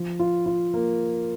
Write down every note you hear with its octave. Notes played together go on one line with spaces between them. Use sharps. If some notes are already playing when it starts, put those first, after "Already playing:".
Already playing: F3
F4
F4
A#3